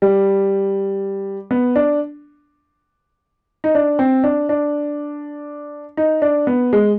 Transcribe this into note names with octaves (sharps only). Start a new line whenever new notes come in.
G3
B3
D4
D#4
D4
C4
D4
D4
D#4
D4
B3
G#3